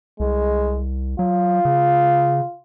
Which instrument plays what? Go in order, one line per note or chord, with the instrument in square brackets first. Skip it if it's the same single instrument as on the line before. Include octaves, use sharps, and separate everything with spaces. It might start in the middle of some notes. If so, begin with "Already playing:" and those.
[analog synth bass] C2 [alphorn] G#3
[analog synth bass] F#3 [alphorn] F4
[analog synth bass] C#3